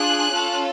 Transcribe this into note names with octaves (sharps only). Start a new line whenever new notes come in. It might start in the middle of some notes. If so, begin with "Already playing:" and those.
Already playing: D4 F4 G#4 F#6
C#4 F4 A4